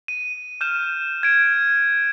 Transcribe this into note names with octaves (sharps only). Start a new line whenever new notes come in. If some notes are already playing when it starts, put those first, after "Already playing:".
D#7
F6 G6 E7
G#6 D7